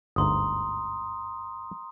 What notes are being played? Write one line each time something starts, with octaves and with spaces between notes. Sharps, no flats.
G1 D2 G#2 A#5 C6 D#6